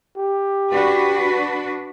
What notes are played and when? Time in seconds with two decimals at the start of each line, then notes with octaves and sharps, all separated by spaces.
0.18 G4
0.72 D4 F#4 B4